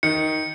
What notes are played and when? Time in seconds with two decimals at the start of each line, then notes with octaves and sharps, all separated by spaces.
0.03 D#3 C#7